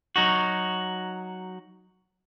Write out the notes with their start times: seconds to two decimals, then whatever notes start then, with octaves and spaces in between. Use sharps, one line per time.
0.16 F#3 D#4 F#4